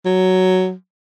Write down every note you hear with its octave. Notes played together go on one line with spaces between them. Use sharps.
F#3